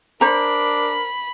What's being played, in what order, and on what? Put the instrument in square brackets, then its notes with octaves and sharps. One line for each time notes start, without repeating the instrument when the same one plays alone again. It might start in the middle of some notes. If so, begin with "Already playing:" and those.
[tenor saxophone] D4 [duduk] A#4 [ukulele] C5 A#5 [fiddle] B5